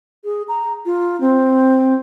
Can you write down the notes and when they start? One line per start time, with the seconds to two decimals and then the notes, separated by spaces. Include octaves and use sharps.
0.24 G#4
0.48 A#5
0.85 F4
1.20 C4